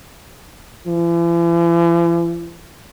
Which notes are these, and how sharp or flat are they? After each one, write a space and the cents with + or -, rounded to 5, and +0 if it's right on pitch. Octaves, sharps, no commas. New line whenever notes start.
E3 +45